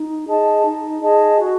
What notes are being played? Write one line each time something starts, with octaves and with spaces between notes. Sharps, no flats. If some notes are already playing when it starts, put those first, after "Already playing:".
Already playing: D#4
G#4 D#5 A5
D#4
G#4 D#5 A5
F#4